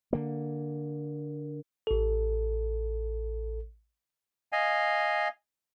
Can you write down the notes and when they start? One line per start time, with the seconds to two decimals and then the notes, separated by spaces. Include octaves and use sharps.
0.13 D3 A#3
1.87 A1 A4
4.52 D#5 F5 G#5